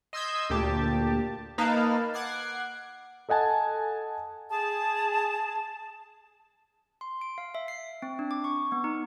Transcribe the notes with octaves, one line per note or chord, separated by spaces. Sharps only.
D#5 C6 E6 G6 G#6 B6
D2 A#2 G4 A5
A#3 D#4 B4 F5 A5
F#5 D6 G#6 C7
A4 D#5 F#5 G#5 A5
G#4 A5
C6
D7
F5
E5
C7
C4
D4
D6
C#6
B3
D#4